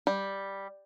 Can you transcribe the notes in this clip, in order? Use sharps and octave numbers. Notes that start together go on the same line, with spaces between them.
G3